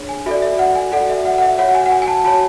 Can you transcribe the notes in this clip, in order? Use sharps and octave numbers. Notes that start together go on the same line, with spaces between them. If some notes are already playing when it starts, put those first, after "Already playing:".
Already playing: D4 G#4 C#5
G#5
F#4 A4 D5 E5
E5
F#5
G#5
F#4 A4 D5 F#5
E5
F#5
F#5
E5
F#4 C#5 F#5
F#5
G#5
F#5
G#5
G#5
A5
F#4 C#5 A5